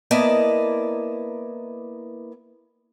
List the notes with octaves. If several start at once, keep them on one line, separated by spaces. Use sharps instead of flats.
A#3 B3 E4 D5 D#5 A5